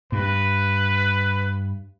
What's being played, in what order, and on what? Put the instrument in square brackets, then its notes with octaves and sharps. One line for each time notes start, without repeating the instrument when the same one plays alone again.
[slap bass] G2 [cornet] B4